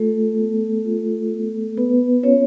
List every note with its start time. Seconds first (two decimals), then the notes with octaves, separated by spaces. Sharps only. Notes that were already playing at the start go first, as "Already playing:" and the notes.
Already playing: A3 F4 A4
0.38 B3
0.85 F4
1.31 B3
1.77 B3 B4
2.23 C#4 F4 C#5